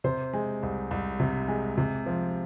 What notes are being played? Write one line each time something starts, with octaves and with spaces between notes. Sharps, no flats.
C3 C5
G#3
C2
C2
C3
G#3
C3
F3